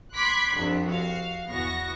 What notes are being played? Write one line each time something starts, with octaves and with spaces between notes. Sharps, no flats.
B5 C6 D6 F#6 G#6 B6
C2 F2 D4
F#4 F5
E2 B3 F#4 C#6 A#6